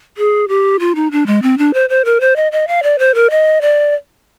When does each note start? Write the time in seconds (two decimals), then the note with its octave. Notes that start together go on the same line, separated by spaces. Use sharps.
0.17 G#4
0.48 G4
0.80 F4
0.95 D#4
1.11 D4
1.27 G#3
1.42 C4
1.58 D4
1.74 C5
1.89 C5
2.05 A#4
2.21 C5
2.36 D#5
2.52 D#5
2.68 F5
2.83 D5
2.99 C5
3.15 A#4
3.30 D#5
3.61 D5